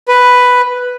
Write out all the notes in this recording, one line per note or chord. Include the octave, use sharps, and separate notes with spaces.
B4